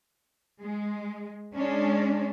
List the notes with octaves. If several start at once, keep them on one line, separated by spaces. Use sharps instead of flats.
G#3
G#3 C#4 D4